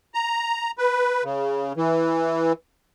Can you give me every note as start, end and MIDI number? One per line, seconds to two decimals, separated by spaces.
0.14 0.71 82
0.78 1.23 71
1.24 1.73 49
1.77 2.52 52